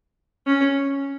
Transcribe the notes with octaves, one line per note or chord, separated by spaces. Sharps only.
C#4